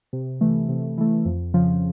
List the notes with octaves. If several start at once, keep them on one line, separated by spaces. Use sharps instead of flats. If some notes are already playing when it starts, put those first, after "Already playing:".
C3
E3 A3
C3
E3 A3
F2
C#3 F3